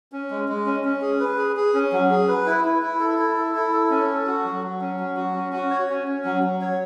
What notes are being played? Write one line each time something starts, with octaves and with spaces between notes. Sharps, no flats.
C#4
G#3
G#3
C#4
C#4
G#4
B4
G#4
G#4
C#4
F#3
G#4
B4
E4
E4
E4
A4
E4
A4
E4
A4
C#4
A4
F#4
F#3
F#3
C#4
F#3
F#4
C#4
F#4
C#5
C#4
C#4
F#3
F#3
C#5